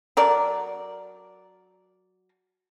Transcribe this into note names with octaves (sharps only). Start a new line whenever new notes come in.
F#3 A#4 D5